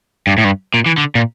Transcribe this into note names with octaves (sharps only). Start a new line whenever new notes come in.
G2
A2
G2
A#2
E3
D3
A#2